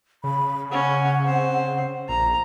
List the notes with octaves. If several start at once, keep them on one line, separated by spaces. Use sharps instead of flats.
C#3 B5
C#4 F#5
C4 C5
A#1 A#5